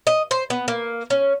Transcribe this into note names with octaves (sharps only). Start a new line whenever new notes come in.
D#5
C5
B3
A#3
C#4